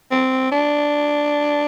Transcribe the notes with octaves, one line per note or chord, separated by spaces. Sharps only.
C4
D4